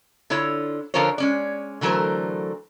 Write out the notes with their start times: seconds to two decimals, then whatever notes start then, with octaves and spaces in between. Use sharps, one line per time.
0.30 D3 E4 F4 C#5
0.94 D3 F3 F4 A#4 C5 C#5
1.18 G#3 C#4 D5
1.81 D3 E3 F#3 A3 A#4 C5